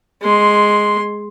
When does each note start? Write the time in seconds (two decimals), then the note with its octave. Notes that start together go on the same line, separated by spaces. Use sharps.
0.22 G#3 C6